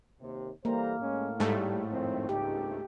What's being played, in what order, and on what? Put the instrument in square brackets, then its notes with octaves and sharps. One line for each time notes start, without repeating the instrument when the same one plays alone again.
[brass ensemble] D#2 C3
[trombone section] E3 G3 [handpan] A#3 [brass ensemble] A4 C5 A#5
[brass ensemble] A2 [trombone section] G#3 C#4
[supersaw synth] G#2 A3 [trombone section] G3
[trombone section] F2 D#3 C4
[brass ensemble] G#1 G2 D#4 [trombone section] C#2 [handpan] G4